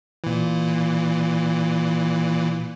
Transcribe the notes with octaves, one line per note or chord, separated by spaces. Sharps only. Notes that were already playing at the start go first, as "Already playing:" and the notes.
A#2 E3